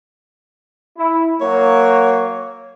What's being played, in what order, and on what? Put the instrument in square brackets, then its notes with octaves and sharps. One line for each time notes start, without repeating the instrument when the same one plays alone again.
[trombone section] E4
[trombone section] F#3 A#3 [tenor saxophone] C#5